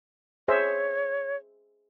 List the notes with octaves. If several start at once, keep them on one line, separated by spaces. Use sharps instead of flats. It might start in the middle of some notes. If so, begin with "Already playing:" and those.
G#4 C5 C#5 E5